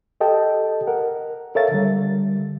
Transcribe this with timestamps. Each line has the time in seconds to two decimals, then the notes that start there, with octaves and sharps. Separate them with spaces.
0.20 G4 A4 D#5 G5 A5
0.87 A#4 F#5
1.55 A4 A#4 C#5 E5 F5 A6
1.72 D3 G3